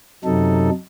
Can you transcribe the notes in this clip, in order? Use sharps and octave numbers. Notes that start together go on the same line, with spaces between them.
F#2 C3 F#3 D#4 A4